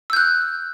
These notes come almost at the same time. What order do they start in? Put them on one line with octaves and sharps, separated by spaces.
E6 G6 F#6